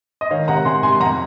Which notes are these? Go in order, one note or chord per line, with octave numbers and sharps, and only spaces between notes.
D#5
D#3 C#5 F5
C3 F#5 A#5
C3 G#5 C6
C3 G#5 C6
F2 F#5 A#5